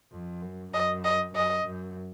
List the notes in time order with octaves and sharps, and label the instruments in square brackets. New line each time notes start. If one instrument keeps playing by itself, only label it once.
[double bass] F2
F#2
[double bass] F#2 [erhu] D#5
[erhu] D#5
[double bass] F#2 [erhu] D#5
[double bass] F#2